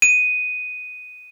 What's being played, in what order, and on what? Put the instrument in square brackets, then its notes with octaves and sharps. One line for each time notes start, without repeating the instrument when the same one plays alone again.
[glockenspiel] D#7